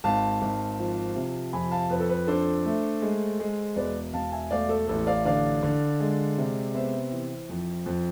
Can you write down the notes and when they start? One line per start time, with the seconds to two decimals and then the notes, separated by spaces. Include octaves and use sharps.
0.04 G#1 F5 A5
0.42 G#1
0.79 F3
1.16 C3
1.53 F2 G#5 B5
1.71 F5 A5
1.90 F2 B4
2.00 A4
2.09 B4
2.27 D4 A4 C5
2.65 A3
3.02 G#3
3.40 G#3
3.76 E1 B4 D5
4.13 E1 F5 A5
4.32 E5 G#5
4.51 A3 D5 F5
4.69 A4
4.88 A1 A4
5.07 D5 F5
5.25 D3 D5 F5
5.63 D3
6.00 G#3
6.38 C3
6.74 B3 C5 E5
7.12 E3
7.50 F2
7.86 F2